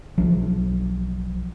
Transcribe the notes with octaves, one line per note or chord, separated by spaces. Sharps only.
B1 F3 F#3